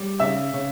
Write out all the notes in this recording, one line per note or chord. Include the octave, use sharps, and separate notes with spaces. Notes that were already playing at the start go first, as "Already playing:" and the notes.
Already playing: G3
C#3 E5 E6
C#3